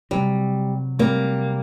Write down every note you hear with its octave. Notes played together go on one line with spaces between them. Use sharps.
C3 F#3 G3 C4
C3 F#3 G3 A#3 C4